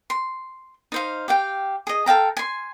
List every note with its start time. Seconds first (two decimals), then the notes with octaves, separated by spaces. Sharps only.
0.10 C6
0.92 D#4 C5 F5
1.28 G4 F5 G5
1.87 G#4 D#5
2.06 A4 F5 G5 A#5
2.37 G#5 C6